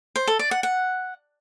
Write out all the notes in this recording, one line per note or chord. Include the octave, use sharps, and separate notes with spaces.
C5
A4
D5
F#5
F#5